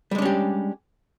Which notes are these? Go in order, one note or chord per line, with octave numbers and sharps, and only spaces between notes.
G3 G#3 C#4 D4 G4